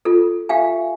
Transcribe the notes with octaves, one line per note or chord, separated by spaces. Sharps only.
F4 A4
G4 E5 F5 G#5